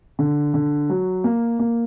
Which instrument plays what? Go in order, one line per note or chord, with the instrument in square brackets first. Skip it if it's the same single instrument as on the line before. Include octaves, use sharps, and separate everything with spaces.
[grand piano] D3
D3
F#3
A#3
A#3